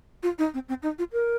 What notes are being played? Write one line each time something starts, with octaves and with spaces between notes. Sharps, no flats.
F4
D#4
C4
C4
D#4
F4
A#4